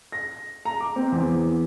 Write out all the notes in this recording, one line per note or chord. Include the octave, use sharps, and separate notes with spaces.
A#6
A#5
D6
C4
E2